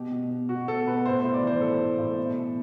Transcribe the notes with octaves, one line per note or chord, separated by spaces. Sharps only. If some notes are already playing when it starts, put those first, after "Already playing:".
Already playing: B2 G4
B2
B2
B2 F#4
B2 A4
B2 B4
A2 C5
A2 C5
D5
E3 C5
E3 A4
A2
A2
B2
B2